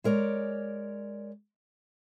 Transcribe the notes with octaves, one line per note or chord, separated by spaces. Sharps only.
G#3 A#4 C#5 D5